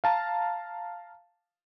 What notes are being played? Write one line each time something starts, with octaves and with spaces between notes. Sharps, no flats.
F5 A5 A#5